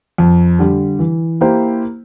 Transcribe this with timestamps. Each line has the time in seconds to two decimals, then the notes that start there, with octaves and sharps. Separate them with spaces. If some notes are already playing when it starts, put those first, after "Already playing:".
0.18 F2
0.59 D3 G3
0.99 E3
1.41 A#3 E4 G4 C5